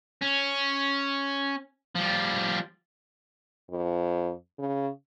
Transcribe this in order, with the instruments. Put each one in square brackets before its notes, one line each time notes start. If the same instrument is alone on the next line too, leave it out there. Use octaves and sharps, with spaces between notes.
[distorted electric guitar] C#4
F3 G3
[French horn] F2
C#3